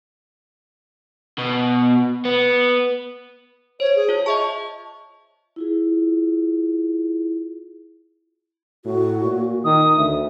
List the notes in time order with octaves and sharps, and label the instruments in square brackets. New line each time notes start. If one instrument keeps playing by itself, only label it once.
[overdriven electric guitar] B2
B3
[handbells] C5 [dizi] C#5
[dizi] G#4
[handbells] F4 C#5
[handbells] D#5 E5 A5 [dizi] C#6
[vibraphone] E4 F4 G#4
[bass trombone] A2 [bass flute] F#4
[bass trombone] A#2
[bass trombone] D#3 [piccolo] D#6
[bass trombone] D2 [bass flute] E5